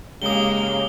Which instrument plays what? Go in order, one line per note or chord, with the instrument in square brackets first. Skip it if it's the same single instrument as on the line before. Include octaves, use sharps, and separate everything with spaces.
[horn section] C#3 G4 [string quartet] G#3 A#3 [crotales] D#6 G7